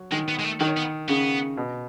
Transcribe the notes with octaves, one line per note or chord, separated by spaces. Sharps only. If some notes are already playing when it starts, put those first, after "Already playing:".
Already playing: F#3
D#3 G#3
B3
G#3
A3
D#3 F#3
B3
C#3 B3
B2